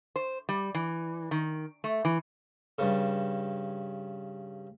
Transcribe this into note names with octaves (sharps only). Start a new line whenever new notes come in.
C5
G3
E3
D#3
A3
E3
G2 C#3